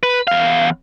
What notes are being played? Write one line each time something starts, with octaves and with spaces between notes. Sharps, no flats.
B4
E2 F5